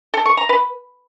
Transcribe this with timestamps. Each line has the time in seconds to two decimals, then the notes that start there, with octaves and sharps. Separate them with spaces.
0.14 A4
0.25 C#6
0.37 A#5
0.49 B4